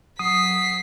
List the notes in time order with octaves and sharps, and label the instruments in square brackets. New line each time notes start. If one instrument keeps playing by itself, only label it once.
[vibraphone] F#3 [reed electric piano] D#6 [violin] B6 C7